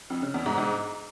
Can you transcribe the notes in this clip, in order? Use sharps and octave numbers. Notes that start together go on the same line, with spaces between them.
F2
C#3
E2
G#2
G#2